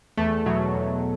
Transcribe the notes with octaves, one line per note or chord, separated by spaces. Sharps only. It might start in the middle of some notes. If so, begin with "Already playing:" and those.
E2 A3 A4
B2 F#3
E2